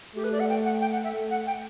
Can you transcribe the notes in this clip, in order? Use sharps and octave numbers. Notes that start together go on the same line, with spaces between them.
A3 G4
B4
D5
F#5
G5
F#5
G5
F#5
E5
A3
F#5
G5